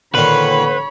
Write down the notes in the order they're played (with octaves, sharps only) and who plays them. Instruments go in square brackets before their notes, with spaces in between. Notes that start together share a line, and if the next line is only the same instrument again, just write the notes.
[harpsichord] A#2 D#3 [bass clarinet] D3 [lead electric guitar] B4 [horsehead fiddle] C#5 B5